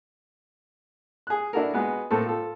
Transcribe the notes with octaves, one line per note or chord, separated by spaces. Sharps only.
G#4 F#6
D4 E4 F#4 A4 A#4
G#3 B3 F#4
A2 A#3 C4 A4
F4 A4